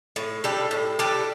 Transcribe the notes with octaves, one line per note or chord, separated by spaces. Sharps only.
A2
G3 D4 A4
A2
G3 D4 A4